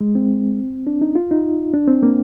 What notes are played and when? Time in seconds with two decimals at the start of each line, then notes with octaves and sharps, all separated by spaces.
0.01 G#3
0.15 C4
0.87 D4
1.01 D#4
1.15 F4
1.31 D#4
1.74 D4
1.87 C4
2.03 A#3